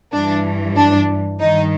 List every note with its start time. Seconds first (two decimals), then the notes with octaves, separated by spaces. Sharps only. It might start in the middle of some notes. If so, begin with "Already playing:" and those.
0.13 G2 E3 D4
0.76 D4
1.40 G2 D#3 D#4